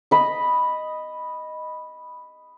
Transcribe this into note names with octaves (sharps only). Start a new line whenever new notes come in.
D#5 B5